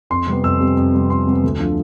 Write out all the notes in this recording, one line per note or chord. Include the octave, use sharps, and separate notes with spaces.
F2 C6
C3 G3 B3
F2 E6
C3 G3 B3
F2
C3 G3 B3
F2 C6
C3 G3 B3
D2
D3 F3